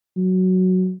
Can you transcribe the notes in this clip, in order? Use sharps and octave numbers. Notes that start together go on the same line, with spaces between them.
F#3